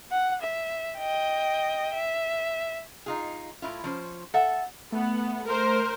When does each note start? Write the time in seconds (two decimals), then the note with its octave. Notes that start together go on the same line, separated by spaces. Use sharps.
0.12 F#5
0.42 E5
0.99 D#5 G5
1.94 E5
3.06 D#4 F4 G#4
3.62 A2 E4 F4
3.84 F3 C#4 C5
4.34 A4 E5 F#5
4.92 A3 B3
5.47 A#4 C5